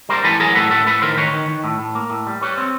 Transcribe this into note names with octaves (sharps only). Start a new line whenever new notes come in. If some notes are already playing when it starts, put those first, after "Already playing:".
G3 A#4 C5
E3 A4 B4
F#3 G#4 A#4
A2 A4 B4
A2 A4 B4
A2 A4 B4
D#3 A#4 C5
D#3 B4 C#5
D#3
D#3
A2
A2
A#3
A2
G3
G3 B4 C#5
C4